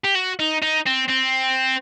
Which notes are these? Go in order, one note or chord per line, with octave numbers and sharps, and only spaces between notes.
G4
F#4
D#4
D#4
C4
C4